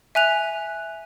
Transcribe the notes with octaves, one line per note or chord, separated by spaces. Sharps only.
E5 G#5 F#6 F7